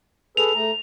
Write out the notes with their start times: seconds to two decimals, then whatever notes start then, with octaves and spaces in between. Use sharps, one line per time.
0.37 G#4 A4 B4 F7
0.55 A3 A#5